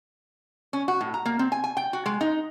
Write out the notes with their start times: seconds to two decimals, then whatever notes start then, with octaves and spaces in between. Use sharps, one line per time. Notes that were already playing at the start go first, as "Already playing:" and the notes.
0.73 C#4
0.88 F#4
1.01 A2
1.14 A#5
1.26 A#3
1.39 C4
1.52 G#5
1.64 G#5
1.77 G5
1.93 F#4
2.06 G#3
2.21 D#4